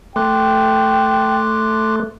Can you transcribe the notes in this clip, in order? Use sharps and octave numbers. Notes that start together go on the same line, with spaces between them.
A3 G5 C6 D6 F#6